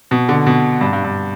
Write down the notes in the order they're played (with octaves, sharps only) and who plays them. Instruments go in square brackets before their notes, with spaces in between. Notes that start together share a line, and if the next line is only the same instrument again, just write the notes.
[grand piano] B2
D3
B2
G2
G2
G2